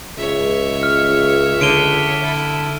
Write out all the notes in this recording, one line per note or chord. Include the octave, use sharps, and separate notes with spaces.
C#2 C#5 E5
F6
D3 D7 D#7 G7
E4 A4